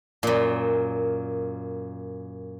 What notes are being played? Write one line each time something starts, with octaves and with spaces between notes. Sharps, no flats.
F#2 A#2